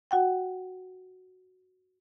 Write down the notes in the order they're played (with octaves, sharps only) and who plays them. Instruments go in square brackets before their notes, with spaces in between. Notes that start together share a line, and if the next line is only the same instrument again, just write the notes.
[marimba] F#4 F#5 G5